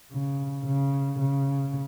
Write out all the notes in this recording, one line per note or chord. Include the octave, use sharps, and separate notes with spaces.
C#3
C#3
C#3